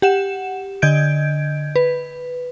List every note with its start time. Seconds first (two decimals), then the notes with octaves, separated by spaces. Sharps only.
0.02 G4 F#5 E7
0.82 D3 D#5 G6 G#6 D7
1.76 B4